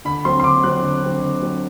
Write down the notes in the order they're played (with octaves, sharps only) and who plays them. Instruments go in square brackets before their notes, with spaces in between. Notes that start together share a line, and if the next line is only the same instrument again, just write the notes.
[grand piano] D3 B5
F#3 C4 C6
C6
D3 D6
F#3 C4 F#6
D3
F#3 C4
D3
F#3 C4